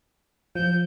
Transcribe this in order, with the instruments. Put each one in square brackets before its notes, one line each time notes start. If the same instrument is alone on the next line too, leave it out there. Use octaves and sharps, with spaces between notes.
[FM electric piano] F3 [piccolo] G6